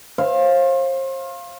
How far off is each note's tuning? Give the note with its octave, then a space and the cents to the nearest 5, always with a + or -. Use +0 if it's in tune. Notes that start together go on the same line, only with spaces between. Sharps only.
C5 +40 F5 +0